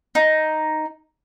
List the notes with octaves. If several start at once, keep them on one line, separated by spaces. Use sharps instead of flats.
D#4